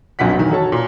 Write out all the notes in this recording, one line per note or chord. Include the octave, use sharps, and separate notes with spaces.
F1 B1 A#2 D3 F#5 B6
B2 D#3 E3 F#3
F#4 A4 C#5 A5
A#2